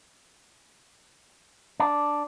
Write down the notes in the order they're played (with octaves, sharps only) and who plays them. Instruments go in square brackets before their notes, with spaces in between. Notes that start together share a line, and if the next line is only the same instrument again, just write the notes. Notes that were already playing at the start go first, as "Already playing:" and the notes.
[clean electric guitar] D4